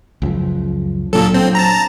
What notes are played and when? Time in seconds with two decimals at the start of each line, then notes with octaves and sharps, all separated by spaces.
0.22 C#2 F#2 F3
1.13 A#2 F#3 D4 A4
1.34 C4
1.55 A5 A#5